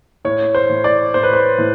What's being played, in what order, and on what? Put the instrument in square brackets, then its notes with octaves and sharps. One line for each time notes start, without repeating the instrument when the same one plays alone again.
[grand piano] A2 C#5
C5
A2
D5
A2 C5
B4
C5
A2